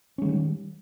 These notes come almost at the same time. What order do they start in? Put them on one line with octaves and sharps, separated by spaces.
C#4 G#3 D#3 G3